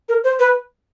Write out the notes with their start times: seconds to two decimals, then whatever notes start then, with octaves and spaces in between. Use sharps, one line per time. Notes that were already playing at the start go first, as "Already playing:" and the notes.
0.09 A#4
0.24 C5
0.39 B4